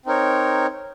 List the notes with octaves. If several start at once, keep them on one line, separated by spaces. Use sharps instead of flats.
C4 D#4 A#4 C#5